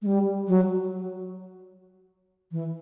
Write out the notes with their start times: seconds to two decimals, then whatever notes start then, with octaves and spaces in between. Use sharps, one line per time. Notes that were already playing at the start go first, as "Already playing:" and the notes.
0.02 G#3
0.06 G3
0.48 F#3
2.52 E3